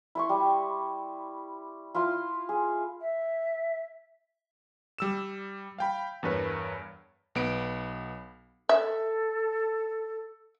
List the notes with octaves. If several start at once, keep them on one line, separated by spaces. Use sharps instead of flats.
E4 C6 C#6
G3
E4 F4 F5 C6
G#4
E5
G3 E6 E7
F5 G5 B5
E2 G2 A#4 B4 C#5
B1 B3 D7
A4 E5